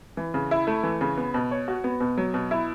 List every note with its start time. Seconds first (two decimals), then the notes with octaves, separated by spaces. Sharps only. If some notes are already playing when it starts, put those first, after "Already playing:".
0.17 E3
0.34 C#3
0.51 E4
0.67 A3
0.83 E3
1.01 C#3
1.17 B3
1.34 B2
1.51 C#5
1.68 F#4
1.84 B3
2.00 B2
2.17 F#3
2.34 B2
2.51 E4